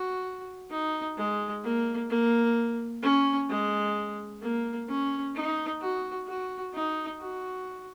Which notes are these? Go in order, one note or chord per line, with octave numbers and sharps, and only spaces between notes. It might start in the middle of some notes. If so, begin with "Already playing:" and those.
Already playing: F#4
D#4
G#3
A#3
A#3
C#4
G#3
A#3
C#4
D#4
F#4
F#4
D#4
F#4